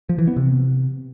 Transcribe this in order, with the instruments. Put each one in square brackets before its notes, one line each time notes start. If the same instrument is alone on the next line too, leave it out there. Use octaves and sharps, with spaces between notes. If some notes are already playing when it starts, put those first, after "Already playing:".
[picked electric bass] F3
E3
B3
C3